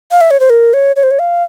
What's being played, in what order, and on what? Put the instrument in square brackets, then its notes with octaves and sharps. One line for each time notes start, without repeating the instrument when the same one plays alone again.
[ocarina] F5
E5
C#5
C5
A#4
C#5
C#5
C5
C#5
F5